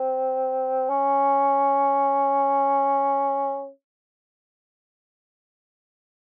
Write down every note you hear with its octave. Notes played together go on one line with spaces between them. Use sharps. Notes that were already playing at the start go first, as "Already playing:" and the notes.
Already playing: C4
C#4